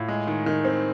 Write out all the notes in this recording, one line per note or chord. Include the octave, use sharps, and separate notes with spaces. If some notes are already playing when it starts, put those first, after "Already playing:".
Already playing: A2 F4
G#3
D#3
D#3
C4